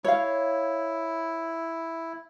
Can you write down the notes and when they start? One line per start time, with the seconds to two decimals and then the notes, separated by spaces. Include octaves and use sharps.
0.05 E4 C#5 F5